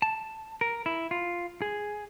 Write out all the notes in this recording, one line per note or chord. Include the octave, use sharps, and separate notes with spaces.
A5
A#4
E4
F4
G#4